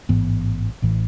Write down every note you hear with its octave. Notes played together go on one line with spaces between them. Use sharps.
A1 G#2 E3 B3
A1 A2 E3